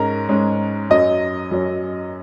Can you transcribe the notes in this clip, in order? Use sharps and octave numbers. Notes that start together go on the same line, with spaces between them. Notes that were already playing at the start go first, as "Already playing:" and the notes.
Already playing: G#2 G#3 C#4 A#4
G#2 G#3 C#4
F#2 F#3 C#4 D#5
F#2 F#3 C#4